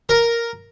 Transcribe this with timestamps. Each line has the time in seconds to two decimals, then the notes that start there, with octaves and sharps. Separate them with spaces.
0.09 A#4